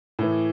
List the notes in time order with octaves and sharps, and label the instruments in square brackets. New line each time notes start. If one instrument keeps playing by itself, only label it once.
[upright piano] A2 E3